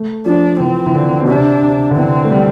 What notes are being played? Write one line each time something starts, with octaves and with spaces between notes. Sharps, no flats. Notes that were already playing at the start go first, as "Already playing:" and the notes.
Already playing: A3
F3 D4
E3 C4
E3
D3
B2
C3 D4
C3
D3
E3 C4
A3
G3